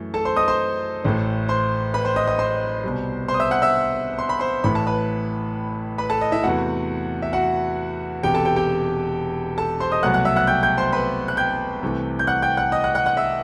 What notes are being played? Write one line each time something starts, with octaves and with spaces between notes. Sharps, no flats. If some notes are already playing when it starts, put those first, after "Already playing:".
Already playing: F#2 E3 A3
A4 A5
C5 C6
D#5 D#6
C5 C6
A1 A2 E3 A3
C5 C6
B4 B5
C5 C6
D#5 D#6
D#5 D#6
C5 C6
C2 B2 G3
C5 C6
D#6
E5 E6
F#5 F#6
E5 E6
C6
B5
C5 C6
A1 A2 E3 A3 B5
A5
B4 B5
B4 B5
A4 A5
D#5
E4 E5
E2 C3 E3 A3 F#4 F#5
E5
F#4 F#5
E1 E2 C3 G4 G5
A4 A5
G4 G5
G4 G5
A4 A5
C5 C6
D#5 D#6
C2 B2 F#3 A3 F#5 F#6
F#5 F#6
E5 E6
F#5 F#6
G5 G6
G5 G6
C5 C6
B4 B5
F#6
G5 G6
C2 C3 E3 A3
G6
F#5 F#6
G5 G6
F#5 F#6
D#5 D#6
F#5 F#6
F#5 F#6
F#5 F#6
E5 E6